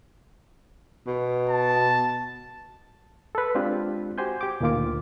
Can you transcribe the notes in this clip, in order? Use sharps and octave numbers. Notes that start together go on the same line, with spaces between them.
B2
A5
A4 B4
G#3 C4 D4 F4 G4
F#4 G4 C5 G#5 G6
G4 D6
D2 A#2 D#3 A#3 F4 D6